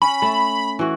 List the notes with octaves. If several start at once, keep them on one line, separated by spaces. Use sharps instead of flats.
C#4 B5
A3
E3 F#4